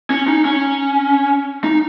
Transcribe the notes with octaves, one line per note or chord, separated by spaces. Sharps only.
C#4
D#4
C#4
D#4